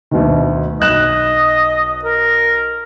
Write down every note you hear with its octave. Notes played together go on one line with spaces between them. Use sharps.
D2 B2 D#3
B1 D#5 F#6 E7
A#4